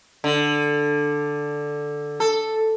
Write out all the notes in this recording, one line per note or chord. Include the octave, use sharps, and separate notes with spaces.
D3
A4